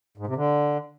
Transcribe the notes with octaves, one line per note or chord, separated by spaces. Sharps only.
G#2
C3
D3